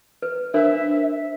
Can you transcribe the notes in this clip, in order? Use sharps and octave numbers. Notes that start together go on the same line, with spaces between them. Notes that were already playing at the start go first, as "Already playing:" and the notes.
B4
D4 A#4 C5 E5